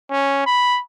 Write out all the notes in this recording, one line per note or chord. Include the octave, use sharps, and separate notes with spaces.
C#4
B5